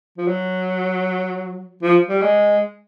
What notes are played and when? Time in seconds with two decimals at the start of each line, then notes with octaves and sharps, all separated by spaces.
0.18 F3
0.28 F#3
1.83 F3
2.09 G3
2.22 G#3